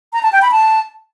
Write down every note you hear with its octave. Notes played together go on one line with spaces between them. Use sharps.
A#5
A5
G5
B5
A5